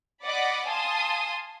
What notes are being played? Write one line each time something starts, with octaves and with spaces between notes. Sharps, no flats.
D5 D#5 F#5 B5 D6
F5 G#5 A5 C6 D#6